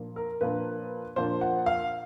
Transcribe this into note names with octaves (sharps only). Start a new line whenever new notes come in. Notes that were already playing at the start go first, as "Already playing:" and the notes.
Already playing: A#2 F3 A#3 D4
A#4
A#2 F3 A#3 D4 B4
A#2 F3 A#3 D4 C5
F#5
F5